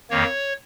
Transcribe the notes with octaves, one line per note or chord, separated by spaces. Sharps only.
F2 D#3 A#3 C#5